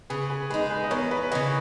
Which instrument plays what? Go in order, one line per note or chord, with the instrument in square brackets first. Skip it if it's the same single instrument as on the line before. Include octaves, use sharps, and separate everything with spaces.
[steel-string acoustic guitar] C#3 [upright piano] G#4 B4
[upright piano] G#4 B4
[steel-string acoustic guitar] G#3 D#4 [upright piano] G#4 B4
[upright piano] G#4 B4
D#5
[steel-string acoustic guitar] E2 [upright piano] A#4 C#5
[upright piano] B4 D#5
[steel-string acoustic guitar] C#3 E3 [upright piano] B4 D#5